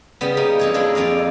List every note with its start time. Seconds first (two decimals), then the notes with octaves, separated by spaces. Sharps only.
0.21 C#3 G3 B3
0.37 A#3 D#4
0.59 F2 A#3 C#5
0.74 G#3 D4 E4
0.95 F2 D5 D#5 F5